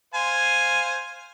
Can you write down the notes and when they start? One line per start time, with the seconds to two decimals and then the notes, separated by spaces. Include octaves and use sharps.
0.14 C5 F5 G#5